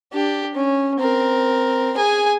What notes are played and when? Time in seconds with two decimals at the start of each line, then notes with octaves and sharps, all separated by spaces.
0.13 D4 G4
0.55 C#4
0.99 C4 A#4
1.97 G#4 G#5